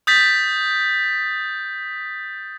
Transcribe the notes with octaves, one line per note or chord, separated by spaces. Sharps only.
D#6 G6 A6 B6